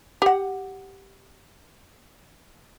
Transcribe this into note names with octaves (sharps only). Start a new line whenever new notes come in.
G4 F#5